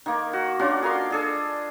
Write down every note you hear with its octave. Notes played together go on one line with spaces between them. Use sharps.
D#3 A#3
F#4
C#4 D4 F4 F#4
G#4 A#4 F5 C6
D4 G#4 A4